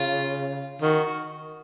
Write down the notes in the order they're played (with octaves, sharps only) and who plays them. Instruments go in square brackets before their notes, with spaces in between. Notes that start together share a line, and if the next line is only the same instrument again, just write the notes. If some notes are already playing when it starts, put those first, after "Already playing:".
Already playing: [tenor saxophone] C#3 [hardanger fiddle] F4
[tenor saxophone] D#3 [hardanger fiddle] F#4